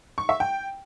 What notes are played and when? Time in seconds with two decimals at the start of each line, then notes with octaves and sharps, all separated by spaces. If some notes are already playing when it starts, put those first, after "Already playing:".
0.18 C#6
0.29 E5
0.40 G5